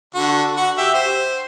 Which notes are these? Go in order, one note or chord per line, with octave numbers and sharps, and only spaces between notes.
D3 F#4
F#4 F#5
G4 E5
C5